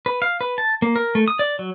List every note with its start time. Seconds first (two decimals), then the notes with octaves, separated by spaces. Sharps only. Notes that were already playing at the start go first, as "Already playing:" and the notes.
0.06 B4
0.22 F5
0.41 B4
0.58 A5
0.82 A#3
0.96 A#4
1.15 A3
1.28 D#6
1.39 D5
1.59 F#3